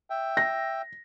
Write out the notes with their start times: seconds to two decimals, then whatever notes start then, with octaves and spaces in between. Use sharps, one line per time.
0.10 E5 G5
0.37 A#6